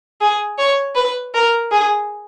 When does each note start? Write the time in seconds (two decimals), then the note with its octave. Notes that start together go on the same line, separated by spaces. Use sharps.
0.21 G#4
0.59 C#5
0.95 B4
1.34 A#4
1.72 G#4